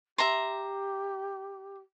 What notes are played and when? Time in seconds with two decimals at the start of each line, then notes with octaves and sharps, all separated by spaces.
0.18 G4 E5 A#5 C6